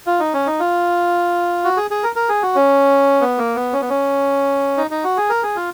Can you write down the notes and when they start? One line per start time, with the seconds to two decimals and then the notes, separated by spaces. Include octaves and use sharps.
0.07 F4
0.20 D#4
0.34 C#4
0.47 D#4
0.60 F4
1.64 F#4
1.77 G#4
1.91 G#4
2.03 A#4
2.16 A#4
2.29 G#4
2.43 F#4
2.56 C#4
3.21 B3
3.38 A#3
3.55 B3
3.73 C#4
3.81 B3
3.90 C#4
4.77 D#4
4.91 D#4
5.04 F#4
5.17 G#4
5.30 A#4
5.43 G#4
5.56 F4